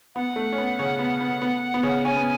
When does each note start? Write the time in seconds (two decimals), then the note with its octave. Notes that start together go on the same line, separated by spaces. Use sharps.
0.15 B3 F#5
0.36 A3
0.52 C#4
0.58 B3
0.79 C#3 C#4
0.99 B3
1.21 B3
1.42 B3
1.74 B3
1.83 C#3 C#4
2.05 C#4 G#5
2.16 B3